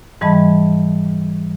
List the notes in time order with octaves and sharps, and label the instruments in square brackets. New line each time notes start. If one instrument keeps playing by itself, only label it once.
[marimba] G#2 E3 G3 D#5 A5 B5